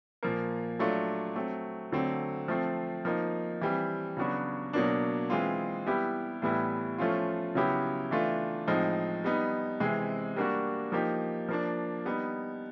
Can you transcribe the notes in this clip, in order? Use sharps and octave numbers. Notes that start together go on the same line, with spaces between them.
A#2 F3 A#3
F#3 A3 D4 F4
F#3 A3 C4
D3 F#3 A3 C4
F3 A3 C4
F3 A#3 D#4
E3 G3 C4
C#3 F#3 B3 D4 F#4
B2 F#3 A#3 D4
E3 G#3 C4 F4
G3 B3 E4 G4
A2 E3 G3 B3 E4
F3 A3 C#4 F4
C#3 F#3 B3 E4 G4
E3 A3 D4 F4
A2 F3 G#3 C4 D#4
G3 B3 D#4
C3 E3 G#3 C4
G3 A#3 D4 F#4
F3 A#3 D#4 G4
F3 A#3 D4
G3 B3 D#4